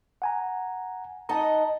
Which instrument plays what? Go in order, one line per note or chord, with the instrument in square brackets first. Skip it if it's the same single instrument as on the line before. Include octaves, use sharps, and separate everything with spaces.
[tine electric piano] F#5 G#5 A#5
[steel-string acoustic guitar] D#4 D#5 F#5 [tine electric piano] A5 A#5